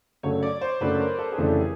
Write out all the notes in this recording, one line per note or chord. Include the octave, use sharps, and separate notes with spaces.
F#2 C#3 F#3 A3 D4 C#5
D5
C5
F#2 C#3 F#3 A3 D4 B4
A#4
A4
G#4
F2 C#3 E3 A3 D4
G4
G#4